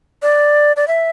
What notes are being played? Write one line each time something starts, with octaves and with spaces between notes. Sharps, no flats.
D5
D5
E5